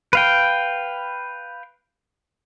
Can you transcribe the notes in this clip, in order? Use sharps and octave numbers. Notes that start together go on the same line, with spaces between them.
B4 F5 G5